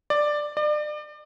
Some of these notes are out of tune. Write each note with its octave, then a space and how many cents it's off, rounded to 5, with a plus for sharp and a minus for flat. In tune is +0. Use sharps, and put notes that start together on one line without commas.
D5 +10
D5 +35